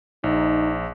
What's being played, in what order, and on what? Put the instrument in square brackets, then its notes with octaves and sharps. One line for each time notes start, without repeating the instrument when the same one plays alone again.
[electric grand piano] A#1 [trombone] D#4